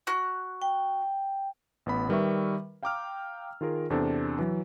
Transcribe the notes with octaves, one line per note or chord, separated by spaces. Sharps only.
F#4 F#6
G5
A1 B3 B5
D#3 G3 A#4 B4 E5 C#6
F5 G5 A#5 D6 E6 F6
D#3 F4 G#4 A#4
E2 C3 C4 D4 A4
E3 F#3